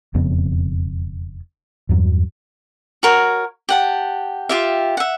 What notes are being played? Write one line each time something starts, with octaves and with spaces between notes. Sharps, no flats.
E1 F2 C#3 B3
E2 G2 F#3
F#4 A#4 C#5
G4 F#5 A5
F4 G4 E5
E5 F#5